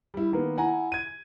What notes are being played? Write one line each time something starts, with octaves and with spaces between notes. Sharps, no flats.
G3 E4
D#3 A#3 B3
E4 F#5 G#5 A#5
G#6 D#7